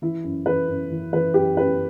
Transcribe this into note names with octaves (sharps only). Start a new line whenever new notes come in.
E3 E4
F#2
E3 B4
F#2
E3
E3 B4
F#2 G4
F#2 B4